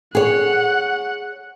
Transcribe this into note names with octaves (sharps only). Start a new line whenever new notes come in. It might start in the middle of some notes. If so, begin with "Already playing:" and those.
G#4 C#5 F#5